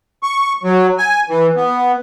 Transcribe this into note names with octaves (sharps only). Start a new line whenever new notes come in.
C#6
F#3
G#5
E3
B3